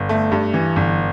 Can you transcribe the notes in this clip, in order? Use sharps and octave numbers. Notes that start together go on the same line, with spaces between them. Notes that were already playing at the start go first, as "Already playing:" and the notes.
Already playing: G1
A3
G2
E3
G1